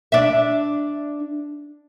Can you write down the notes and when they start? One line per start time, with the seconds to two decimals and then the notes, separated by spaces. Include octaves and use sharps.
0.12 D4 E5